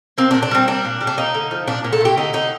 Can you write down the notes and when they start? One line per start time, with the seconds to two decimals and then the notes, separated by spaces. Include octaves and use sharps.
0.18 A#3 C4
0.31 D4
0.35 A#2
0.43 D4
0.51 G3 C4
0.67 A#3 D4
0.85 A#2
1.01 G3
1.07 D4
1.17 A#3 D#4
1.34 D3
1.51 F3
1.67 A#2 D4
1.84 A#2
1.93 A4
2.01 A3 G4
2.17 D3 D#4
2.33 D3 D#4